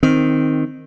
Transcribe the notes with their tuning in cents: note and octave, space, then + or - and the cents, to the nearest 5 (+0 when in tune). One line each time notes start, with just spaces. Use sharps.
D#3 +0 C4 +0